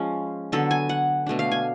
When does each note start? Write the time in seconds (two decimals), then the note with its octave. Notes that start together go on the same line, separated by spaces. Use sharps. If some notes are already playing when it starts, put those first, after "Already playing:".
Already playing: F3 G#3 C#4
0.52 D3 F#3 B3 A4
0.71 G#5
0.89 F#5
1.26 B2 A3 D4
1.39 F5
1.52 G#5